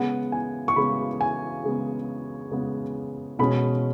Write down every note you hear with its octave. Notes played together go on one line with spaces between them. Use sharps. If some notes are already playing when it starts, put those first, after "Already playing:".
Already playing: C#3 G#3 B3 F#5
G#5
C#6
C#3 G#3 B3 B5
G#5
C#3 G#3 B3
C#3 G#3 B3
B2 G#3 C#4 B5